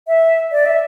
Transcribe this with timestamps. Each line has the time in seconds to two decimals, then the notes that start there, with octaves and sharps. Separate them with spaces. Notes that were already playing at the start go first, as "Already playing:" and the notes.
0.08 E5
0.52 D5
0.66 E5